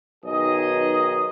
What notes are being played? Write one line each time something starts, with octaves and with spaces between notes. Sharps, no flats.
B1 D#3 G#4 D#5